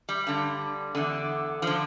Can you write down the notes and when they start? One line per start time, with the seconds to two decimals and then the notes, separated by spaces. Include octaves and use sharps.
0.09 G3
0.27 G2 D3
0.95 E2 D3
1.62 D3 F3